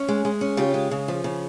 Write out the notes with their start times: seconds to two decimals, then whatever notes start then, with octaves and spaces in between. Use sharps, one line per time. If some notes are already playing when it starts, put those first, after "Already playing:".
Already playing: C#4
0.08 G#3
0.25 G#3
0.41 C#4
0.57 C#3 F4 G4
0.74 G#3
0.91 C#3
1.08 F3
1.24 C#3